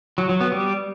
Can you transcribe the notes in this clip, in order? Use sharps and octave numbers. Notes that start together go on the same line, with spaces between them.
F#3
F#3
B3
G3